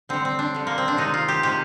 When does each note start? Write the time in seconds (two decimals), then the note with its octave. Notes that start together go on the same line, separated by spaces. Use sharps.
0.09 D3 G3 C4
0.25 C4
0.39 D4
0.54 D3 G3
0.67 A#3
0.78 C4
0.88 D4
0.97 C3 D#3 G#3 D#4
1.14 F4
1.28 G4
1.43 C3 D#3 G#3 G4